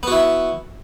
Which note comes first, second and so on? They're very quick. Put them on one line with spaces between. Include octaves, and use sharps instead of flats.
B3 F#4 E4